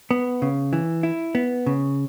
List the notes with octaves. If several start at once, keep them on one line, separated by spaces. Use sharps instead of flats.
B3
C#3
E3
E4
B3
C#3